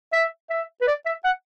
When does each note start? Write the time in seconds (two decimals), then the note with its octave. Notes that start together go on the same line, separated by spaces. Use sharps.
0.13 E5
0.50 E5
0.81 B4
0.87 D5
1.06 E5
1.24 F#5